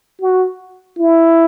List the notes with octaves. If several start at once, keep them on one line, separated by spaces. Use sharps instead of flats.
F#4
E4